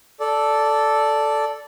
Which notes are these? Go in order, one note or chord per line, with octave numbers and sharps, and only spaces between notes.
A4 D5